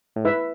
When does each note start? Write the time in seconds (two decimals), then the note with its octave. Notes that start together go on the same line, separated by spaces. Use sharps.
0.16 A2
0.25 G#2 E4 B4 E5